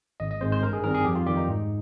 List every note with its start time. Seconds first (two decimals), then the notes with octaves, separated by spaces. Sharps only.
0.20 G#1 D#5
0.31 D#5
0.41 G#2 D#3 G#3 C4 C5
0.52 C5
0.63 G2 A#4
0.73 G#4
0.84 D#3 G3 C4 A#4
0.94 G#4
1.05 F2 G4
1.15 F4
1.26 D#3 G3 G4
1.37 D#4
1.48 G#2